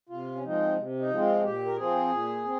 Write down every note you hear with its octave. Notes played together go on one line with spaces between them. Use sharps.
C3 F4
C#4
F3 G#3 C4 D#4
C3
D#4
F3 G#3 C4
F4
A#2 G4
A#4
F3 C4 G#4
A#2
C4